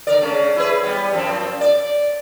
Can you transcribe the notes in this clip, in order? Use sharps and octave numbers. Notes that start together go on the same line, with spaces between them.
D3 A#4 D5
C#3 G#3 C#4
E4 G#4 B4
G3 B3
F#2 F3 C4
D5